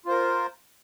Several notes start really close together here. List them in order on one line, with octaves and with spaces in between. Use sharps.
F4 C5 A#4